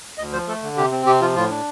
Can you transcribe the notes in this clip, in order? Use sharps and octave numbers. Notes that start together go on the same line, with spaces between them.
D2 D#5
F3 C5
A3 A4
D3
C3 G4
C4
C3 G4
F3 F4
A2 F4
D4